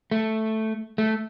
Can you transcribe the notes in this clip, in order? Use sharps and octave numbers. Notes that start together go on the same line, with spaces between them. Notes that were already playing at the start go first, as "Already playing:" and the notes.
A3
A3